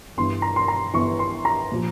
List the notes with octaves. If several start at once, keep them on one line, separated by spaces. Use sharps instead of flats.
G1 G2 E3 C6
A#5
C6
A#5
G1 G2 E3 C#6
C6
A#5
A#2 F3